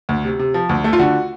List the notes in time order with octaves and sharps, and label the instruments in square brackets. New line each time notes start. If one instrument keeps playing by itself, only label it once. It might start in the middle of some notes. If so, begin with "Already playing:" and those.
[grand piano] D2
C3
C3
F3
D2
A3
[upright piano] F4
[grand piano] D3 [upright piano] F#4